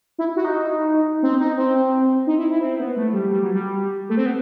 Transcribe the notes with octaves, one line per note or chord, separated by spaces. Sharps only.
E4
F#4
D#4
C4
D#4
C4
D#4
E4
E4
C4
B3
A3
G3
G3
F#3
G3
A3
C4
B3